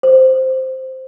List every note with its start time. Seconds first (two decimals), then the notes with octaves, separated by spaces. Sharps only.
0.03 C5